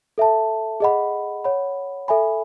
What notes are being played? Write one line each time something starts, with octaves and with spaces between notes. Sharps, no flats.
A4 E5 A5
G#4 D#5 F#5 B5
C#5 F#5 B5
A4 E5 G#5 B5